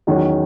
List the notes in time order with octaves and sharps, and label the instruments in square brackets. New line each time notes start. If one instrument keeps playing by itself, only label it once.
[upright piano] E2 D#3 F#3 C#4 F#4